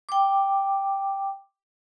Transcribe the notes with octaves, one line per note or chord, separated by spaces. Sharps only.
G5 D6